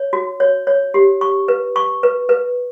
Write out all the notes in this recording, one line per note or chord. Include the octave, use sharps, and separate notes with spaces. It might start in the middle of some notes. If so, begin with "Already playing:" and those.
Already playing: C#5
F#4
C#5
C#5
G4
C#6
B4
C#6
B4
B4